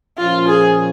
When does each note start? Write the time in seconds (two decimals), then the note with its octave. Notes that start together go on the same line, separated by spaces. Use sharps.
0.18 A#2 F3 A#3 C#4 F4
0.48 G#4